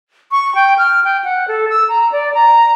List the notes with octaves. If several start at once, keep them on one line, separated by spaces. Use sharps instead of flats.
C#6
G5
F6
G5
F#5
A4
E6
A#5
D5
A#5